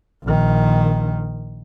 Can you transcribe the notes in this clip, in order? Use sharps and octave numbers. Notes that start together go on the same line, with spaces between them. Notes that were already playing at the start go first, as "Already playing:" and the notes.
A#1 D#3